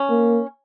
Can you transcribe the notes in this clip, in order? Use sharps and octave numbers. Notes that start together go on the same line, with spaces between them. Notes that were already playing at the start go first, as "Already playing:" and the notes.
Already playing: C#4
A#3